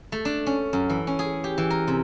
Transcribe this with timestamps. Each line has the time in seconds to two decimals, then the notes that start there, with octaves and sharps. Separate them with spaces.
0.12 A3
0.25 D4
0.47 C#4
0.73 F#2
0.90 E3
1.07 C#4
1.19 G#4
1.44 G4
1.58 E3
1.70 A#4
1.88 C3